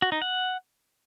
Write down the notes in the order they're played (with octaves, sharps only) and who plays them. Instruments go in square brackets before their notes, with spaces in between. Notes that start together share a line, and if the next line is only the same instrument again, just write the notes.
[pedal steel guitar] F#4
D#4
F#5